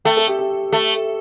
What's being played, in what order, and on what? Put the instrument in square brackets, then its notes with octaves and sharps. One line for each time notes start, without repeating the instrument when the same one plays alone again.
[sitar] A3 [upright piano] G5
[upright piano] A4
G4
G4
[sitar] A3